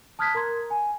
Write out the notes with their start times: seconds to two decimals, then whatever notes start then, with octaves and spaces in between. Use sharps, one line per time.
0.19 A5 D#6 F6 F#6 G#6 B6
0.35 A#4 A#5 C6 G#6
0.70 G#5